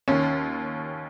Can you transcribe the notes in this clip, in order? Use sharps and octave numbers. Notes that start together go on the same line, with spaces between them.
D#2 D#3 C#4